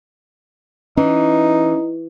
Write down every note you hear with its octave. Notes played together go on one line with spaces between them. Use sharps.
E3 C#4 D#4